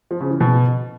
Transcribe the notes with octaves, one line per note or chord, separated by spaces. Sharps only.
F3
C#3
E3
B2